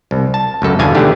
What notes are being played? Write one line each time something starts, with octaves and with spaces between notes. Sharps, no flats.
C2
A5
C#2 F#2 A4
E2 B2 D3 F5 G#5
G#2 D3 A3 B3 D4 G4